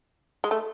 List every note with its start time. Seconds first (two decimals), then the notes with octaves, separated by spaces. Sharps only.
0.44 G#3
0.51 A3